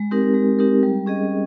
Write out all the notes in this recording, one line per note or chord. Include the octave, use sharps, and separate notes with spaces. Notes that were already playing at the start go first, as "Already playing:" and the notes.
Already playing: G#3
C4 D#4 G4 A#4
G#3
C4 D#4 G4 A#4
G3
C#4 G#4 D#5